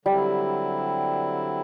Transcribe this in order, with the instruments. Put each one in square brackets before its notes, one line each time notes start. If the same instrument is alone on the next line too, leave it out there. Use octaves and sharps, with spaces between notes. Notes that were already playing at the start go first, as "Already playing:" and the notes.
[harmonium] D3 F#3 C4 E4 [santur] G3